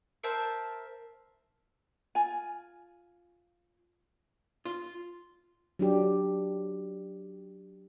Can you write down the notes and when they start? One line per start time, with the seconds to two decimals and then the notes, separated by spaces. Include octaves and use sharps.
0.24 A#4 C5 E5 A5
2.15 F4 G#5
4.65 F4
5.79 F#3 D4 G4